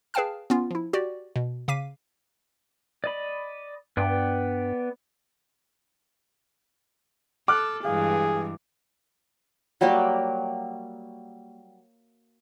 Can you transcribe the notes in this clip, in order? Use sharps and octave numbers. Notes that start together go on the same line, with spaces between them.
G#4 B4 F5 G5 A5 F6
B3 C#4 F4
F3 E4
F#4 G4 D5
B2
C#3 F5 D6 B6 D#7
D5 D#5 B5
G2 B3 D5 G5
A4 D6 F6 F#6
G2 E3 G#3 G#4 F5
F#3 G3 A#3 G4